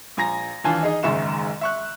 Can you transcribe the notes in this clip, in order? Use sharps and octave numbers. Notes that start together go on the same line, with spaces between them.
A#1 G#5 A#5 A#6
D#2 E3 D4 F4 G#5 A5
D#4 G#4 D#5
F#1 G#2 D#3 E5 C#6 E7
E5 C#6 F#6